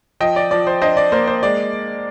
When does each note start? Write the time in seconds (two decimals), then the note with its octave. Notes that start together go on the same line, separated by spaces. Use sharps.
0.20 F3 D#5 G5
0.36 D5
0.51 F3 D5
0.67 C5
0.82 D4 C5 D#5
0.97 D5
1.12 A#3 C5
1.28 C5
1.43 G#3 D5